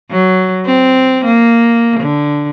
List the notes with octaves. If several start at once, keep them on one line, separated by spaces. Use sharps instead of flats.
F#3
C4
A#3
D3